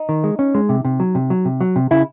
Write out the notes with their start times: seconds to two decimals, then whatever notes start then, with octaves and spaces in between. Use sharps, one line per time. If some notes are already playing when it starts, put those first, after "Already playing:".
Already playing: D#4
0.09 D#3
0.24 G#3
0.39 C#4
0.55 G#3
0.69 C3
0.85 C3
1.00 F#3
1.15 C3
1.30 F#3
1.45 C3
1.61 F#3
1.76 C3
1.91 C#3 E4